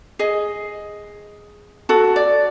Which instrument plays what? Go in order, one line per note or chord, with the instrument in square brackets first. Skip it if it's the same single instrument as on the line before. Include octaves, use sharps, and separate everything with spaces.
[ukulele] G#4 D#5
F#4 A4
D5